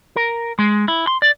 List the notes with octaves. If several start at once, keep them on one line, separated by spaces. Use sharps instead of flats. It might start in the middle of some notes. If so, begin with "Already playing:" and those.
A#4
G#3
E4
C6
D5